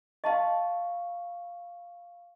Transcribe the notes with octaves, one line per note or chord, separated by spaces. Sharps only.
D#5 F5 A5 C6 C#6